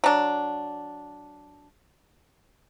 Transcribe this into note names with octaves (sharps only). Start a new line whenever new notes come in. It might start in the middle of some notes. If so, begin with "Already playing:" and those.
F#3 D4